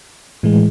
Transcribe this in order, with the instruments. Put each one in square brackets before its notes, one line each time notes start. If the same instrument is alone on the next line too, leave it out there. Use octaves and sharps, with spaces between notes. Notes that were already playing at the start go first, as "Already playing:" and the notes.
[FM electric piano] A2 E3 G#3